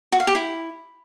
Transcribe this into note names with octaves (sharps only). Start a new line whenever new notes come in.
F#4
F5
G4
E4